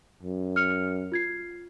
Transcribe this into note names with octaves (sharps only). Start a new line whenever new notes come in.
F#2
F6 C#7 F7
F4 G#6 C7